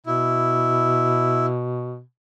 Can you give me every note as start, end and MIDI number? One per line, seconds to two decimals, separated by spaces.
0.06 2.01 47
0.06 1.46 64